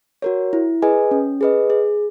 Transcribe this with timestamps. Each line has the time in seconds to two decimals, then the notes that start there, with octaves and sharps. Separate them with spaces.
0.22 F#4 A#4 C#5
0.53 E4
0.82 G#4 B4 D#5 G#5
1.11 C#4
1.41 G#4 B4 D#5
1.70 G#4